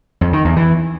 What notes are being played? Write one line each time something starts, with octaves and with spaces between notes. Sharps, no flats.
F2
D#3
E2
E3